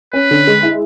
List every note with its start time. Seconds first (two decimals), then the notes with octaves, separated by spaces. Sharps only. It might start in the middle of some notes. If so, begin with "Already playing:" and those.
0.13 C#4 B4
0.31 D3
0.47 G#3
0.63 E4